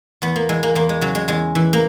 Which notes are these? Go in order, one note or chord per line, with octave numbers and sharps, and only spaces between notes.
E2 B3
A#3
E3 G#3
A#3
E2 A#3
G#3
C#3 F#3
G#3
E2 G#3
E3
A#3